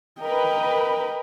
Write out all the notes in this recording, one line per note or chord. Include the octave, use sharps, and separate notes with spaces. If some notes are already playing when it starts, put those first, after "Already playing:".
A#4 B4 D#5 G5